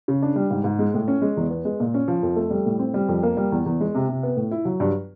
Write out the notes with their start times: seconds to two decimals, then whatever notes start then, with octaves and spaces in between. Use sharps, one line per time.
0.08 C#3
0.22 D4
0.36 G3
0.51 G#2
0.64 G#2
0.79 G#3
0.94 A2
1.08 C#4
1.22 G#3
1.37 E2
1.51 B3
1.65 G#3
1.80 A#2
1.94 C#4
2.08 F3
2.23 F2
2.36 A3
2.51 G3
2.66 A2
2.79 C4
2.94 G3
3.09 F2
3.23 A#3
3.37 G3
3.52 E2
3.66 E2
3.80 G#3
3.95 C3
4.09 C3
4.23 B3
4.37 A2
4.51 E4
4.65 F#3
4.80 G2